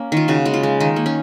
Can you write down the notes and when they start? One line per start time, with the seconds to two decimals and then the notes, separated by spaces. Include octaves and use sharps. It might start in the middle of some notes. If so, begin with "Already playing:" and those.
Already playing: A#3 C#4
0.12 D#3 F4
0.28 C#3 F#4
0.46 G#3
0.54 F4
0.63 G#3
0.80 D#3 D#4
0.96 A#3
1.06 C#4